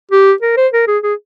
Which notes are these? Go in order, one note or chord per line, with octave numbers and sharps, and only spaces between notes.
G4
A#4
C5
A#4
G#4
G#4